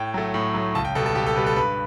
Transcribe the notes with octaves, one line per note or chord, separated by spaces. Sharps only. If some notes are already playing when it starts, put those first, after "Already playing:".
Already playing: A2 G5
F#3 A3
A2
F#3 A3
C#2 A5
G5
B2 G3 A4
A4
C#2 G4
A4
B2 G3 B4
A4
G2 B4